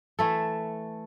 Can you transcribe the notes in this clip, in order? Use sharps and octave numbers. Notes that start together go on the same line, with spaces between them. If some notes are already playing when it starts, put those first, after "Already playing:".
E3 A3 A4